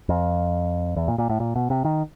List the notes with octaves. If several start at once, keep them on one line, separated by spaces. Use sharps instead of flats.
F2
E2
A#2
A#2
A2
A#2
B2
C3
D#3